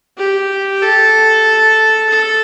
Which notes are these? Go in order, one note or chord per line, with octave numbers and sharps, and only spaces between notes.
G4
A4
A4